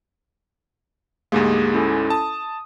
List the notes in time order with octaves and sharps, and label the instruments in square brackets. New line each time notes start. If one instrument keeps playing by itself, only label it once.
[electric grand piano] D2 G#2 G#3 [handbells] A#3 G4 G#4
[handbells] C#4 E4 A4
[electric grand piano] A5 [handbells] D#6